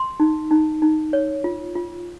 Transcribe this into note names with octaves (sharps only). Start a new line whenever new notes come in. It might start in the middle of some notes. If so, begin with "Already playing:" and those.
Already playing: C6
D#4
D#4
D#4
C#5
F4
F4